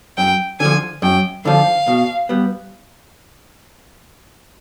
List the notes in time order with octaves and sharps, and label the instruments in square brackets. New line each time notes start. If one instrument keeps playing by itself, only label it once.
[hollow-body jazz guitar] F#2 [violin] G5
[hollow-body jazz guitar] D3 F3 [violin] G#5
[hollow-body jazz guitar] F#2 [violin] G5
[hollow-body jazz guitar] D3 F3 [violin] F5
[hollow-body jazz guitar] B2
G3 B3